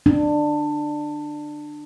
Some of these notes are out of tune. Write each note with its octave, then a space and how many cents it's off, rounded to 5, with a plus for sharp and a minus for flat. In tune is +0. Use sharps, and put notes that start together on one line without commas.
D4 +20